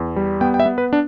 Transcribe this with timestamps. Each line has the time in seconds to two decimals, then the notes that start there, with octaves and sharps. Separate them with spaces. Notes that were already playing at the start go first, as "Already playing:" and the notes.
Already playing: E2
0.16 G3
0.41 B3 G5
0.54 G5
0.60 E5
0.66 B3
0.78 B4
0.93 D4